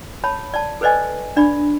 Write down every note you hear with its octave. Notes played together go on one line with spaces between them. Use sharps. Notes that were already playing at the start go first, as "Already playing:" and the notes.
C#5 A5 B5
D5 A5
A4 B4 C5 D5 D#5 G#5
D4 D5 B5